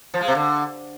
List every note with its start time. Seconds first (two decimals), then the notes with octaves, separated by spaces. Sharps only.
0.14 F3
0.21 G#3
0.28 C3
0.35 D3